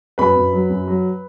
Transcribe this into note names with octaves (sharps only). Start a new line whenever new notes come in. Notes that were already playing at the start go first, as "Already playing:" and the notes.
F#2 B4 B5
F#2
F#3
F#2
F#3